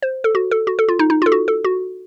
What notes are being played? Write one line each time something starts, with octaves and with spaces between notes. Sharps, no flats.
C5
A4
F#4
A4
F#4
A4
F4
D#4
D#4
F4
A4
F#4
A4
F#4